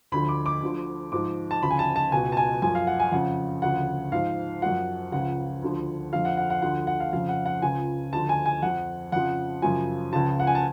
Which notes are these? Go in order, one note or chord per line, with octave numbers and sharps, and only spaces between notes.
D2 D3 F3 B5
D6
D6
D2 D3 F3
G#2 F3 D6
A5
D2 C#3 F3 B5
G#5
A5
A5
C#2 B2 G#5
A5
G#5
F#2 F3 G#5
F5
F#5
G#5
F2 C#3 F3 F#5
D2 C#3 F3 F#5
G#2 F3 F5
F#2 F3 F#5
C#2 C#3 F3 F#5
D2 D3 F3
F2 D3 F3 F5
F#5
F#5
F#5
D2 D3 F3 F#5
F#5
F5
F2 C#3 F3 F5
F#5
F#5
C#2 C#3 F3 G#5
D2 D3 F3 A5
G#5
G#5
F2 F3 F#5
F2 C#3 F3 F#5
F#2 C#3 F3 G#5
C#2 C#3 F3 A5
F#5
G#5
A5